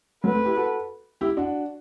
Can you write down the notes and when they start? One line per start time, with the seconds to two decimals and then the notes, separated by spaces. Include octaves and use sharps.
0.24 F#3 A3 B4
0.34 A3 C4
0.45 E4 G4
0.56 F#4 A4
1.21 E4 G4
1.37 D4 F#4